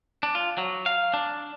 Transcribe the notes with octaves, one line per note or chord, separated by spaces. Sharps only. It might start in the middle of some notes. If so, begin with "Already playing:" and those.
D4
F4
F#3
F5
D4